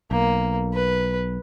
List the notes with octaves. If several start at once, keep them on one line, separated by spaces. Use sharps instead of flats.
B1 A#3
B4